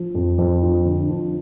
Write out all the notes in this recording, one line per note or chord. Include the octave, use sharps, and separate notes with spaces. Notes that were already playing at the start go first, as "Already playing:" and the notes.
Already playing: F3
F2
F2
F3
D3
F3